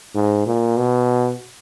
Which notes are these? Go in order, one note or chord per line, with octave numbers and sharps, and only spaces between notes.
G#2
A#2
B2